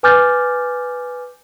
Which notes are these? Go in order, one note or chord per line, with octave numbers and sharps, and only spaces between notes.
B4 G#5 D6 F6 G6 A6